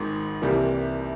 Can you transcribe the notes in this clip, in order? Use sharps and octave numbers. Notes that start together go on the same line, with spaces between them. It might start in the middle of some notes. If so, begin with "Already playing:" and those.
Already playing: G#1 G#2 D#3 G#3
C2 C3 E3 G3 A#3